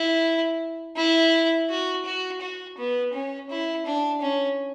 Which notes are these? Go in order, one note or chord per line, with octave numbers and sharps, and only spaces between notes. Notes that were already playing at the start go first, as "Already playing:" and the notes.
Already playing: E4
E4
F#4
F#4
F#4
B3
C#4
E4
D4
C#4